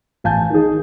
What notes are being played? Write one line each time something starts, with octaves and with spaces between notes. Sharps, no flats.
A1 F5 G#5 A5 G6
D#3 G#4